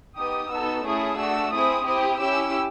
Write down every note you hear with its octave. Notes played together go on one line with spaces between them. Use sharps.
B3 D#4 G4 D#6
B3 D#4 F#4 A4 E6
A3 C#4 E4 G#4 D#6
A3 D4 F#4 E6
C4 E4 G#4 D#6
C4 E4 G4 D#6
C#4 E4 G4 E6